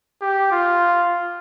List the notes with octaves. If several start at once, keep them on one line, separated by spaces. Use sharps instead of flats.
G4
F4